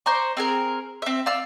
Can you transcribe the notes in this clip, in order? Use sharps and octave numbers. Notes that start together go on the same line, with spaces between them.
C5 D5 A#5 C#6
C4 G#4 A#4
C4 E5
D5 F5 E6